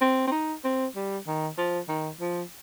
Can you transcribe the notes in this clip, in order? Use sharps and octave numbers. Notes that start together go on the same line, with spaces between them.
C4
C4
D#4
C4
G3
D#3
F3
D#3
F3